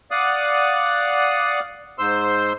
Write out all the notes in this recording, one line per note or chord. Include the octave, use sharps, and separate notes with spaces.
D5 F5 F#5 D#6
G#2 C5 C6 E6